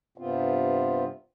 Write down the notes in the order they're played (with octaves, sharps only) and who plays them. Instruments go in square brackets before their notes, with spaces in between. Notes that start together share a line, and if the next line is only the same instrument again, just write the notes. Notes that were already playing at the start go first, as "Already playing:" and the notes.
[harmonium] G2 C3 B3 C4 F4